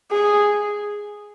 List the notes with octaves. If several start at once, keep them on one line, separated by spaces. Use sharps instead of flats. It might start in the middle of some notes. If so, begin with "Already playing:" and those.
G#4